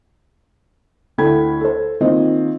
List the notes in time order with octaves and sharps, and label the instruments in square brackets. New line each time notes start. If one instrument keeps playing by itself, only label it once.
[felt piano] D2 D3 E4 G5 B5 G#6
A4 C5
D#3 A#3 C4 F4 D#5